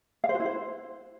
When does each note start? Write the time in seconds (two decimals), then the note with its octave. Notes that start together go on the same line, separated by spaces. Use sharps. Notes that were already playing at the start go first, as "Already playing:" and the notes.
0.24 F5
0.29 C5
0.34 F#4
0.40 E4
0.45 C5